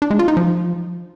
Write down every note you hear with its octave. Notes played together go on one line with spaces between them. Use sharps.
D4
G#3
F4
D#4
F3